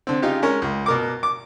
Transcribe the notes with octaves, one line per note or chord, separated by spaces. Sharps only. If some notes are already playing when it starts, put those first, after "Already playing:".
D3 C4
C#3 D#4 F4 G4
G#3 C#4 A#4 C#5
C#2
B2 A#4 D6
D6